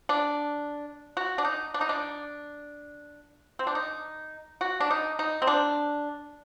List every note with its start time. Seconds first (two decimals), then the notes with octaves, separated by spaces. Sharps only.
0.09 D4
1.17 F#4
1.38 D4
1.45 D#4
1.74 D4
1.81 D#4
1.89 D4
3.59 C4
3.67 D4
3.75 D#4
4.61 F#4
4.80 D4
4.91 D#4
5.19 D#4
5.42 C4
5.47 D4